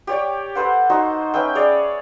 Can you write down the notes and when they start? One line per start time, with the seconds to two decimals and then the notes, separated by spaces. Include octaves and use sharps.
0.07 G4 C#5 D5
0.55 A4 B4 C5 F#5
0.90 D#4 F#4 C5
1.34 C#4 B4 E5 G5
1.55 G#4 C#5 D5